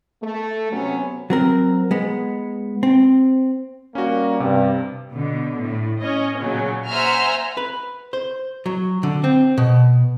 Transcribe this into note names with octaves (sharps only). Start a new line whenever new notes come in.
A3
C3 F#3 B3 C#4
F#3 C4 A#4
G#3 B3
C4
G3 A#3 C#4 F#4
G2 C3
B2 D3
A2
C#4 D#5
A#2 C#3 F#3 C#4
C5 E5 F#5 G#5 A#5 F6
B4
C5
F#3
D3
C4
B2